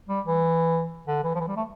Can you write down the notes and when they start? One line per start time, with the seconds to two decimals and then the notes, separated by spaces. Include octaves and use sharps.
0.09 G3
0.25 E3
1.07 D3
1.24 E3
1.35 F3
1.40 E3
1.48 G3
1.57 A3